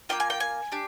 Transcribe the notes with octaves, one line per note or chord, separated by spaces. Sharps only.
A#3 D4 F4 G5
G#5
G5
G#5
D4 G4